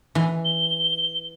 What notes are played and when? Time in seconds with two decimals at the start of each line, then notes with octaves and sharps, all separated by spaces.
0.15 E3
0.44 G7